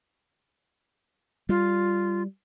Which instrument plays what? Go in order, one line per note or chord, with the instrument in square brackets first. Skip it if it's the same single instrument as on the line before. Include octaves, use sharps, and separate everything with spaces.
[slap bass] G3 [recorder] F4